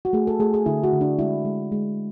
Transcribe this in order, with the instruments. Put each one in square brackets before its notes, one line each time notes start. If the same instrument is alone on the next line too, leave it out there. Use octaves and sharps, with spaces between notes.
[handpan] F#4
A3 G#4
A4
A3 G#4
G#4
D3 E4
F#4
D3
D4
G#3 E4
G#3
G#3